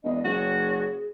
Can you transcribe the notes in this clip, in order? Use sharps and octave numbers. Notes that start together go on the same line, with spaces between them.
E1 D4 D#5
F#1 F#4 G#4 C#5